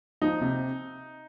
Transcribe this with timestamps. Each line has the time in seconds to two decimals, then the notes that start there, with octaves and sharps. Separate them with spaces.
0.22 F3 D#4
0.41 C3